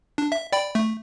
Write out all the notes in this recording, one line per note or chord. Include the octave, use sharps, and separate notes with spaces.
D4
E5
D5 G5 B5
A3